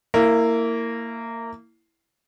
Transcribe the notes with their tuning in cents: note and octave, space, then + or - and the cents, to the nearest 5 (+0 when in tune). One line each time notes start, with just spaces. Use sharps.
A#3 -20 E4 +0